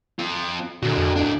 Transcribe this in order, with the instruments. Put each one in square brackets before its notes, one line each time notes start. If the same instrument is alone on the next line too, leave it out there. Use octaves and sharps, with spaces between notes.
[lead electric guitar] C4 F4
[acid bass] A#2 [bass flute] D3 [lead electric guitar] C4 F#4
[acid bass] F2
[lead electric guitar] A2 D4